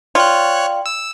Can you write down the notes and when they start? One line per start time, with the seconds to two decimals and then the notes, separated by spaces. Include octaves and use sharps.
0.15 F4 C#5 D5 G5 F#6
0.86 E6